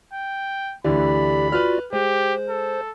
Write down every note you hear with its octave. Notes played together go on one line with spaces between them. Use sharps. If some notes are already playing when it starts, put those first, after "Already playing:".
G5
D2 D3 E3 G4 D5 B5
F4 F#4 B4 D5 F6
G#3 G4 C5
A4